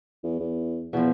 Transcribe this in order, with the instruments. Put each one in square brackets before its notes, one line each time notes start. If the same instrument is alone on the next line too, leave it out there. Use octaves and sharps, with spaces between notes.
[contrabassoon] E2
E2
[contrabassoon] E2 [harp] B2 F3